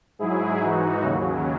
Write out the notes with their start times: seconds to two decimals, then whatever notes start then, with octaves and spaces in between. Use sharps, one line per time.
0.19 G#2 F#3 E4 G#4
0.61 G#2 E3 D#4 F#4
1.03 D#2 C#3 F#3